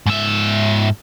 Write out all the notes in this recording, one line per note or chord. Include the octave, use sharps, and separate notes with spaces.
G#2 E5